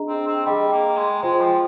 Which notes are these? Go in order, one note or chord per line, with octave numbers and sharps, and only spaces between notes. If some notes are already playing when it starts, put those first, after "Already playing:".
Already playing: D4 G#4 D#5 A#5
C4
C4
G3 G#4 D#5 G5
A#3
G#3
G#3 F4 C5 G5
F3